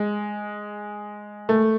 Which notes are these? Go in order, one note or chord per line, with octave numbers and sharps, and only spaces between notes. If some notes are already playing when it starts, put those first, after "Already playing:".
Already playing: G#3
A3